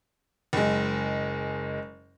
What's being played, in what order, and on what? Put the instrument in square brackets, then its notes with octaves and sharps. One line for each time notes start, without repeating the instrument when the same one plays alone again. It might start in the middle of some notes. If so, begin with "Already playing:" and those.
[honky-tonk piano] F#1 G#3